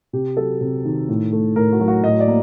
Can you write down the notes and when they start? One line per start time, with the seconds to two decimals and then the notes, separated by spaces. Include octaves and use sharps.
0.13 C3 G4
0.37 F#3 A4
0.61 C3
0.85 D#3
1.09 A2
1.33 A3
1.56 A2 A#4
1.72 F#4
1.80 F#3
1.88 F#4
2.04 A2 D#5
2.20 D5
2.28 A#3